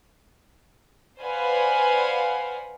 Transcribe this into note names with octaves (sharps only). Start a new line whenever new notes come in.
B4 C5 D5 F5 F#5 G#5